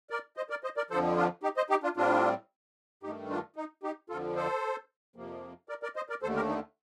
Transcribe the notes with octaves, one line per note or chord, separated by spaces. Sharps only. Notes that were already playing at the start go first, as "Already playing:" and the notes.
A#4 D5
C5 D#5
A#4 D5
C5 D#5
A#4 D5
F2 D3 F3 A4 C5
D4 F4
D#4 G4
C5 D#5
D#4 G4
D4 F4
A2 G3 C4 D4 F4
G2 D#3 A3 D#4 G4
D4 F4
D#4
D#4 G4
F2 D3 F3 F4 A4
A4 C5
F2 C3 F3 A#3
A#4 D5
A#4 D5
C5 D#5
A#4 D5
D#2 D3 A3 A4 C5
G4 A#4
D#4